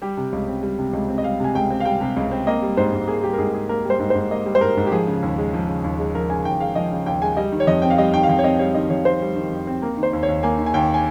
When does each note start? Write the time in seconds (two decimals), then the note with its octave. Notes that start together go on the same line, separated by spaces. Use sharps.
0.02 G3 G4
0.17 C3
0.33 C#2
0.47 C4
0.63 G3
0.79 C3
0.93 C#2
1.09 C4
1.18 D#5
1.24 G3 F5
1.40 C3 G#5
1.55 C#2 G5
1.70 C4
1.80 F5
1.85 G3 G5
2.01 C3
2.17 C#2
2.31 C4
2.47 A#3 D#5
2.62 G3
2.77 G#2 C5
2.93 G#2
3.08 A#3 G#4
3.23 G3 G4
3.33 A#4
3.38 G#2 G#4
3.54 G#2 G#4
3.69 A#3 A#4
3.85 G3 C5
3.99 G#2
4.10 C5
4.15 G#2
4.31 A#3 D#5
4.46 G3
4.55 C5
4.61 G#2 A#4
4.77 G#2
4.87 G4
4.92 F3 G#4
5.07 C#3
5.22 D#2
5.38 G#3
5.53 F3
5.68 C#3
5.84 D#2
5.99 G#3
6.15 F3 A#4
6.30 C#3 G#5
6.45 D#2 G5
6.60 G#3 F5
6.75 F3 D#5
6.91 C#3
7.06 D#2 G5
7.22 G#3 G#5
7.37 G3 D#5
7.52 D#3
7.60 C#5
7.67 F2 D#5
7.82 C4 G5
7.90 F5
7.98 G3 D#5
8.14 D#3 G5
8.23 F5
8.29 F2 G5
8.39 C#5
8.44 C4 D#5
8.59 G3 C#5
8.75 D#3 D#5
8.90 F2 C#5
9.05 C4 C5
9.21 G3
9.36 D#3
9.51 F2
9.67 C4
9.82 A#3 A#4
9.97 D#3
10.03 C5
10.13 D#2
10.23 C#5
10.28 D#2
10.43 A#3 G#5
10.58 D#3
10.66 G#5
10.74 D#2 G5
10.94 G#5